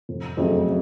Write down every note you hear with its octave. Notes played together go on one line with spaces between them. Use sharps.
F1
F2 C#3 F#3 A3